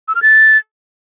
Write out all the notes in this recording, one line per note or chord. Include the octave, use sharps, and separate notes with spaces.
E6
F6
A6